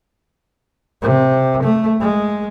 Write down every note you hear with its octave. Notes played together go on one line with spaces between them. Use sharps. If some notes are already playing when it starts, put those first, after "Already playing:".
C3
A3
G#3